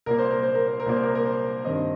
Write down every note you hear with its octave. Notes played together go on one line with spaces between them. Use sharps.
C2 A#2 A#3 A#4
C5
A#4
C5
A#4
C5
A#4
C2 A#2 A#3 C5
A#4
A#4
C5
G2 D#3 C4 D#5